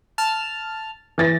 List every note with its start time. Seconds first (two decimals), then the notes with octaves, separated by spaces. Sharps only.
0.18 A5 F6
1.18 E3 A6 A#6